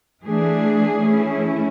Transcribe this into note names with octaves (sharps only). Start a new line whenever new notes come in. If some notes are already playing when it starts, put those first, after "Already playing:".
E3 A3 D4 G#4
E3 A3 C#4 E4